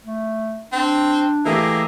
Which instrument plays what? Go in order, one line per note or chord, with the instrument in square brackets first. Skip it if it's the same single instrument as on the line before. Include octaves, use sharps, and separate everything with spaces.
[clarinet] A3
[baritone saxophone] C4 [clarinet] D4
[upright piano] E3 A3 G4 [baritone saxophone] A#3 [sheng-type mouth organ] G#4 D#5 E5